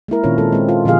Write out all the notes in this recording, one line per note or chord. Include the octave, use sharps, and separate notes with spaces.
G#3 A#3 E4 A#4
A#2 D#3 C4 C#4 F4 C#5
D#3 G#3 C4 A4
G#3 C4
F4
A#2 D3 F3 G4 G#4 F5